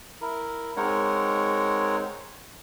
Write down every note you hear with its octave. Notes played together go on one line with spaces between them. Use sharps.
E4 A#4
G#3 C4 D#4 A#4 C#5 F#5